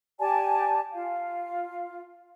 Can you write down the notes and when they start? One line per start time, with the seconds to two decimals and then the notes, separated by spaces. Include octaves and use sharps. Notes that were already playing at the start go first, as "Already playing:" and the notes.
0.20 G4 D5 G#5 A5
0.93 F4 F5